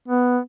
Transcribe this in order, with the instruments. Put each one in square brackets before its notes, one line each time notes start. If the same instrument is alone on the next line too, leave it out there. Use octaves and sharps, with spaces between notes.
[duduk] B3